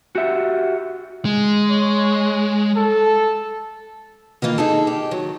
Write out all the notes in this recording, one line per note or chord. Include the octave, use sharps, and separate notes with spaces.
F#4 G4 E5 F#5
G#3
C#5
A4
D#3 E3 A#3 F4
D#4 G#4 A4
G4
D#3 F#3